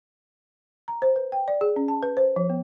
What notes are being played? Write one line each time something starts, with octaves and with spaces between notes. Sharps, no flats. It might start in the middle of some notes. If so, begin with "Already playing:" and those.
A#5
C5
B4
G5
D5
G#4
C#4
A5
B4
C5
F3
B3